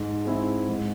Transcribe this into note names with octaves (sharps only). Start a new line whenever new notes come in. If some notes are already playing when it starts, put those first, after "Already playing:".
Already playing: G#2
G#3 C4 E4
G#2